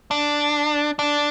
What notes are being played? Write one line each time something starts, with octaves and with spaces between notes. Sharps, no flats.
D4
D4